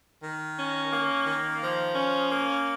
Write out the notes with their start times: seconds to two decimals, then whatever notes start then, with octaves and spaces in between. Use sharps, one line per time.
0.22 D#3
0.58 C#4
0.91 A#3
1.26 D#3
1.60 F3
1.95 C#4
2.30 A#3